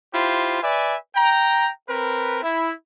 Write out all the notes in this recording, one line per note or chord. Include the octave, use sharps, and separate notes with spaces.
E4 F4 G4 C5
B4 D5 E5 G#5
G5 A#5
C4 A#4 B4
E4